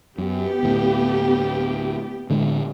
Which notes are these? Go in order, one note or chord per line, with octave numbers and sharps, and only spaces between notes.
F#2 B3 G4
D2 A2
A2 D3 G#3